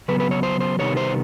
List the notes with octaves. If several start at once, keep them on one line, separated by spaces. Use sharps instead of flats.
C#3 F#3 B3 B4
B4
C#5
C5
C5
C3 D#3 G3 B3 C#5
C5